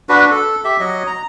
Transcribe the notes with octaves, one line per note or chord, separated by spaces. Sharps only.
D4 F#4 B4
A4
G4 E5
F#3 D#5
A#5